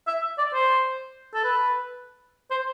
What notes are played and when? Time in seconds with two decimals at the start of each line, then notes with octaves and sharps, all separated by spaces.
0.07 E5
0.38 D5
0.53 C5
1.34 A4
1.44 B4
2.51 C5